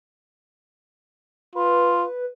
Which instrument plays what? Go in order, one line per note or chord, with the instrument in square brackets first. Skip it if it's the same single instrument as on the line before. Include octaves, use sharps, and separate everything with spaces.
[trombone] F4 [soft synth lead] B4